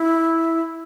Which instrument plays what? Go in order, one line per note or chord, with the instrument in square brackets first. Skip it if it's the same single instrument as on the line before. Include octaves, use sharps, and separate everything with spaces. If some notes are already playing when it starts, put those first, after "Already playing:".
Already playing: [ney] E4